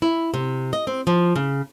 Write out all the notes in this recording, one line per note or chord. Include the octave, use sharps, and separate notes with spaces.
E4
C3
D#5
C4
F3
C#3